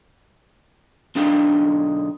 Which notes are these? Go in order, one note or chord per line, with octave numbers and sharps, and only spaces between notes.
B1 D3 D4 D#4 F5 G5